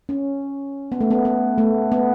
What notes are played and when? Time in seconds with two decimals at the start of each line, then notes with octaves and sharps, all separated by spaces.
0.09 C#4
0.92 B3
1.01 A3
1.11 B3
1.25 B3
1.58 A3
1.92 B3